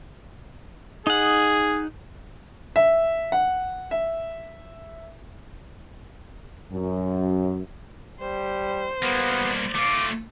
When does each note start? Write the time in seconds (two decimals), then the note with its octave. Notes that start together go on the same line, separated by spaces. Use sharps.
1.07 D#4 G#4 F#5
2.76 E5
3.32 F#5
3.91 E5
6.72 F#2
8.20 G3 C5
9.03 G3 A#3 B3
9.75 A3 F4 D6